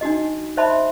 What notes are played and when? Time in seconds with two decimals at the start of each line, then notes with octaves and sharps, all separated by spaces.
0.01 D4 D#4 F#4 D#5
0.57 C5 D#5 E5 A5 B5 C6